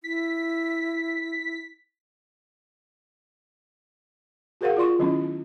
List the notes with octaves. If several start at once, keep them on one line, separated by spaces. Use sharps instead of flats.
E4 B6
F#4 G#4 A#4 C5 F5 F#5
F4 D5 C6 C#6
D#3 F#3 B3 C#4 E4